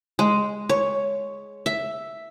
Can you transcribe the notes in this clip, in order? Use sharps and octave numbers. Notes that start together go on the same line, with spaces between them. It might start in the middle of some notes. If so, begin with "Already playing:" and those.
G#3
C#5
E5